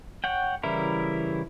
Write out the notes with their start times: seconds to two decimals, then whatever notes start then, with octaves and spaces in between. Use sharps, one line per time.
0.24 C#5 F#5 G5
0.63 C#3 E3 G3 E4 A#4